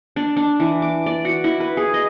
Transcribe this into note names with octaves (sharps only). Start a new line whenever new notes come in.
D4
D4
E3
D6
D5
F#4
E4
B4
G#4
D#5